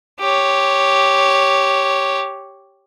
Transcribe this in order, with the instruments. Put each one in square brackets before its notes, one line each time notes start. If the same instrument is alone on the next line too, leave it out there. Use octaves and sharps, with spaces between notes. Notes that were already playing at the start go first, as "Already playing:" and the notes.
[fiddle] G4 C#5